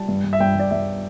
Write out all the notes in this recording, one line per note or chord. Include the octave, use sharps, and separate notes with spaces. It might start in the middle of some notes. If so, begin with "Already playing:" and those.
Already playing: G3 A5
G2
G2
E5
G2 G5
G2 D5
G2 E5